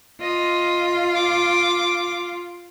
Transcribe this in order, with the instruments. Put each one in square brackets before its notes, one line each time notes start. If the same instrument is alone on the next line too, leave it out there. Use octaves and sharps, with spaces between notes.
[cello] F4 [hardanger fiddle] D#5
[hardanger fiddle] D6